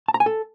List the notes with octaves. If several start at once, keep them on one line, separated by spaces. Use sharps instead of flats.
A5
A#5
G#5
A4